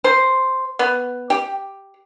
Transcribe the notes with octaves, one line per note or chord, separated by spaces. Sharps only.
C5
B3
G4